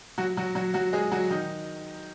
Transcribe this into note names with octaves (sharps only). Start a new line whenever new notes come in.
F#3 F#4
F#3 F#4
F#3 F#4
F#3 F#4
G#3 G#4
F#3 F#4
D#3 D#4